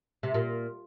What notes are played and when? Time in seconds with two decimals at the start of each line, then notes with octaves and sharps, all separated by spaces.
0.23 C3
0.34 A#2